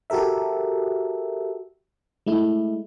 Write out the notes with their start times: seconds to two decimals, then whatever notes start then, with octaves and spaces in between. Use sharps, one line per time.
0.10 F#4 G4 A4 A#4 E5
2.26 G#3 A3 E4